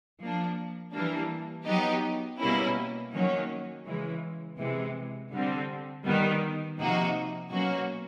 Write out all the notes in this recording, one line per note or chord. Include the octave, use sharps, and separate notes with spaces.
F3 A#3 D4
E3 G3 A#3 D4
F#3 B3 D#4 G4
B2 G3 A#3 C#4 E4
D#3 F#3 A#3 C#4
C#3 E3 G#3
C3 E3 G#3
D3 G3 C4
D#3 G3 B3
C3 F3 A#3 D#4 F#4
B2 F#3 A#3 C#4 F#4